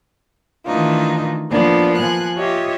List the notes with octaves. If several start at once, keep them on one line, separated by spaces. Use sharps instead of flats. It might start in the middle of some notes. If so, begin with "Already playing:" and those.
D#3 E3 A3 D4 D#4 F4
F3 A#3 B3 D4
F3 G#5 F#6
F4 G4 C#5 D#5 E5